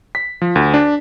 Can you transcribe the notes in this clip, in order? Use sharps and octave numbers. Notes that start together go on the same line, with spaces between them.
B6
F3
D2
D4